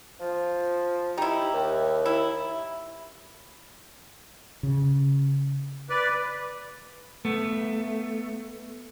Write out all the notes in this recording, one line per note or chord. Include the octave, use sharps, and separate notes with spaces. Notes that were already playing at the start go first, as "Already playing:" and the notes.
F3
D#4 E4 G4
D#2
E4
C#3
B4 D5
A3 B3